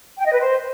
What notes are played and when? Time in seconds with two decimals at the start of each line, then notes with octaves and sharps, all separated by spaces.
0.18 G5
0.26 D#5
0.33 B4
0.41 C5